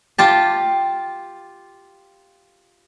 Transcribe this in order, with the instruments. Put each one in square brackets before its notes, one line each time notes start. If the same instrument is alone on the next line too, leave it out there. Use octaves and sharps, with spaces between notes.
[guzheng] F4 G4 A5